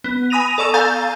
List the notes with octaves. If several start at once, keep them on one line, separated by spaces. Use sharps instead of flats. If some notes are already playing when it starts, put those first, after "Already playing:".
B3
G#5 B5 D#6 A#6 D#7 F7
A4 D5 C#6 E6
A4 F5 G#5 A#5 G6 A6